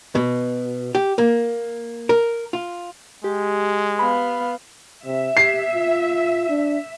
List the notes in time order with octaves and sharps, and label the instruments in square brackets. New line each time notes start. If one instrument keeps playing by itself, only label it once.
[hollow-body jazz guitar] B2
G4
A#3
A#4
F4
[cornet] G#3 [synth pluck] G4
[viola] B3 F5 [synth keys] B5
[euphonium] C3 [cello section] E5
[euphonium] G4 [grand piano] C7
[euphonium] F4
D4